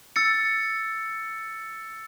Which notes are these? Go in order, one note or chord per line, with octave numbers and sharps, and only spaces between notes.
E6 A6 C#7